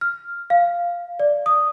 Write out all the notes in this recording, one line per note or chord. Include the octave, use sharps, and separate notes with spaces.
F6
F5
D5
D#6